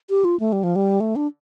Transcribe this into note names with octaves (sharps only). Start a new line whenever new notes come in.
G4
F4
A3
G3
F3
G3
A3
D4